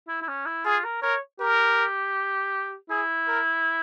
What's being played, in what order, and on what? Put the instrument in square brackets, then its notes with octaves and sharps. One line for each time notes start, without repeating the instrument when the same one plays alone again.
[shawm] E4
E4
C#4
E4
[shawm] F4 [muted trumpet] G#4
[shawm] A#4
[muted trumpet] A#4 [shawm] C#5
[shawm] G4 [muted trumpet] A#4
[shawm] E4 [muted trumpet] G#4
[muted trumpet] A#4